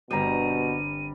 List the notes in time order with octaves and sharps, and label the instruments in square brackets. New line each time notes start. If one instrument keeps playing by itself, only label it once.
[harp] G1 C4 [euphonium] B2 [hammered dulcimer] G3 A#5 [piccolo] D#7